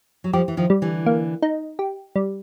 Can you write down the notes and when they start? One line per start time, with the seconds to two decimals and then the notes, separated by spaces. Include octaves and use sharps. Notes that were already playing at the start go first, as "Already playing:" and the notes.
0.24 F#3
0.33 F3 G3 G4
0.48 E3
0.57 D#3 F3
0.70 G3
0.82 D3 E3
1.06 A#3
1.42 D#4
1.79 G4
2.16 G3